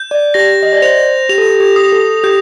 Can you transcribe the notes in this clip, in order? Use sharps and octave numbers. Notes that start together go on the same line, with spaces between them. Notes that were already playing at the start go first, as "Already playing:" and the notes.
Already playing: G6
D5
G4 A#6
D#5
D5
C5 F7
G4 F7
A4
G4
G4
D#6
A4
G4 G6